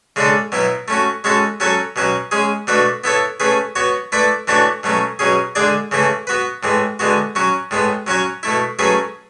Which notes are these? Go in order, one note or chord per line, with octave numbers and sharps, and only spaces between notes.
C#3 G#3 D4 A4
B2 F#3 B3 E4
A3 C#4 F#4
G#3 C#4 F#4 A4
F#3 C#4 F#4 A4 C#5
B2 F#3 C#4 F#4
G#3 C#4 G#4
B2 A3 D4 F#4 B4
B3 E4 A4 C#5
A3 C#4 G#4 B4
B3 F#4 C#5
A3 E4 B4 D5
E3 A3 D4 F#4 C#5
B2 F#3 A3 C#4
B2 F#3 C#4 G#4
D3 G#3 D4 G#4 D5
C#3 E3 A3 E4
B3 F#4 B4
A2 E3 G#3
D3 G#3 B3 F#4
F#3 C#4 F#4
A2 G#3 B3
F#3 C#4 F#4 C#5
B2 A3 E4
F#3 A3 C#4 G#4 B4